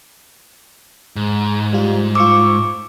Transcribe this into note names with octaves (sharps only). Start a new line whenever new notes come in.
G#2
G3 F4
F4 C#6 D6 E6